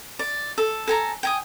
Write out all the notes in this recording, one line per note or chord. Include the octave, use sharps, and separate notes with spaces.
D5
A4
A4 G#5 A#5
G5 G#5 D#6